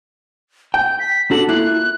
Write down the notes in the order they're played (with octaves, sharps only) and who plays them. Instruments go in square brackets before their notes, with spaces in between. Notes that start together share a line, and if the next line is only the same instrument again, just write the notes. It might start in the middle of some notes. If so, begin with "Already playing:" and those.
[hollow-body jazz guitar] G5 [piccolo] G6
[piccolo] B6
[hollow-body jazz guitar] D4 F#4 A4 [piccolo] F#7
[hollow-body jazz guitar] A#3 E4 F4 [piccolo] F#6